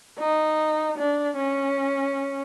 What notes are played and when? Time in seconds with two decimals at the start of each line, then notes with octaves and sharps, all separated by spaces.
0.19 D#4
0.98 D4
1.37 C#4